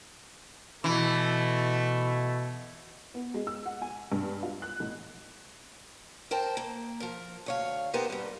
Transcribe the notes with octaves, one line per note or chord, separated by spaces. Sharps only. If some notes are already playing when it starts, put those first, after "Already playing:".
B2 E3 A3
B3
G#3
E6
F#5
G#5
G2
F4
F#6
A1
A#4 C5 G5 A5
A#3
F3 A#4
D2 C#5 F5
B3 D#4 F4 G4 A#4 C5
G2 G3